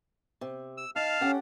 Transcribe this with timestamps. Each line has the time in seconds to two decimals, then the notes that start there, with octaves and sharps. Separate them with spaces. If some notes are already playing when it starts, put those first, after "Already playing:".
0.41 C3
0.77 E6
0.96 D#4 F5 A5 F6
1.21 C#4 G4 A4 F#5